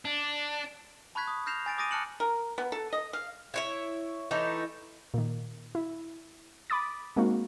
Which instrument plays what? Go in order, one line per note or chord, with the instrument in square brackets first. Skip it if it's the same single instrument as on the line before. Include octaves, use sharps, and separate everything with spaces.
[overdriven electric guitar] D4
[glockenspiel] A5 B5 C#6 F#6 G#6 B6
D#6
F6 G6 A#6 C7 E7 F7
G#5 A6 D7
D6 D#6 A6 A#6 D7 D#7
A5 F6 F#6 C#7 E7 F#7
[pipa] A#4
B3
A4
D#5
F5
[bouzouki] E4 C#5 E5
E3 A3 D#4
[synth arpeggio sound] A#2 D#3
E4
B5 D6 D#6 A6
G#3 A#3 C4 D#4 F#4